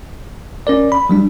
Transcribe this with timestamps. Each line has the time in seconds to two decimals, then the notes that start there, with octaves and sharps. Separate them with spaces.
0.67 C#4 A#4 D5
0.92 B5
1.09 F#3 G3 D4